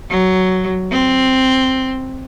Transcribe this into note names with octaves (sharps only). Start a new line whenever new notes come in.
F#3
C4